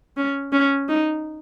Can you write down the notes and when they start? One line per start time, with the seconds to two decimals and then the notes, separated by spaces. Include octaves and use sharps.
0.17 C#4
0.53 C#4
0.89 D#4